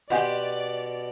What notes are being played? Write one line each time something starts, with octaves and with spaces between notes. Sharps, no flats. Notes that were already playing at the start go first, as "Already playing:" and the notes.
B2 G4 D5 D#5 F#5 G#5 C6